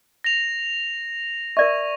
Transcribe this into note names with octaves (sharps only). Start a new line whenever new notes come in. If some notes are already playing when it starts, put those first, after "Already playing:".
A#6 F7
A#4 D5 E5 C#6